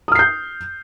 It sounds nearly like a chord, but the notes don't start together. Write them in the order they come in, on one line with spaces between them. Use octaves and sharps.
D#6 F6 C7 G6